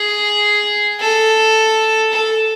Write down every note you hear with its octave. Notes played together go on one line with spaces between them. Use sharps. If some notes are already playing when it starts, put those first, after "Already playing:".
Already playing: G#4
A4
A4